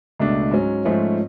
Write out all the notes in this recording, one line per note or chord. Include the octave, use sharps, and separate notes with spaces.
C#2 B2 A3 D4
G#2 F#3 C#4
G#2 F3 A3 C#4